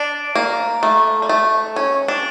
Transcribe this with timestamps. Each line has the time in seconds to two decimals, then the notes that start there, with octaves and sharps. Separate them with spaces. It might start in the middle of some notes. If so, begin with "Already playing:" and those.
Already playing: D4
0.35 A#3
0.83 A3
1.22 G3
1.29 A3
1.76 C#4
2.08 D4